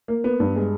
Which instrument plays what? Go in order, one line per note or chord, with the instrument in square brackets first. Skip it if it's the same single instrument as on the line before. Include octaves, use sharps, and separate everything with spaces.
[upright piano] A#3
B3
G2
G#3